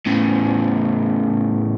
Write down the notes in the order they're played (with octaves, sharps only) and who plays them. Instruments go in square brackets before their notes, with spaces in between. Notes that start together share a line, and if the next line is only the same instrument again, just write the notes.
[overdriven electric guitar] A2 C#3